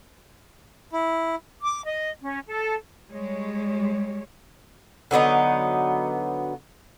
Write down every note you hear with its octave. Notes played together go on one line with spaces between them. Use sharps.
E4
D6
D#5
C#4
A4
G3 G#3 C#5
D3 F#3 B3 D#4